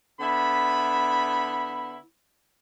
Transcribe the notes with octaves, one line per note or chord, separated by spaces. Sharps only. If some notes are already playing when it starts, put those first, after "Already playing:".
D3 B3 E4 B5